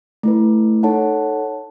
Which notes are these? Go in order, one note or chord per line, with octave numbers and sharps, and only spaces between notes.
A3 E4 B4
D#4 A4 C#5 F#5 A5